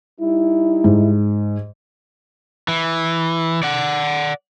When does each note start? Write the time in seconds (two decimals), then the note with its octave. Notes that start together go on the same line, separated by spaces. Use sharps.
0.20 G3 D#4 E4
0.84 G#2
2.68 E3
3.63 D5 F#5